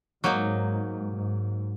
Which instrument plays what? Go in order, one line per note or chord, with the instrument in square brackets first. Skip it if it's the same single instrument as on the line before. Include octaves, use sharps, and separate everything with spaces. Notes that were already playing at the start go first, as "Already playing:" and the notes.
[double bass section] G#2 [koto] F#3 A#3 D#4
[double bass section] G#2